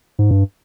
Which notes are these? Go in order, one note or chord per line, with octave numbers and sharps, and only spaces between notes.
G#2
G2